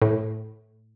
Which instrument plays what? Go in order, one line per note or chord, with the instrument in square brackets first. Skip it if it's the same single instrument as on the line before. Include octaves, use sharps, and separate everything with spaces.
[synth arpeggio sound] A2